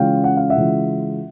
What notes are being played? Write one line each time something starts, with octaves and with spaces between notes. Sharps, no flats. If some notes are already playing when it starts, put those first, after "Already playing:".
Already playing: C#3 E3 G#3 C#4 F4 F5 G5
F#5
F5
E5 F#5
C#3 E3 G#3 C#4 F4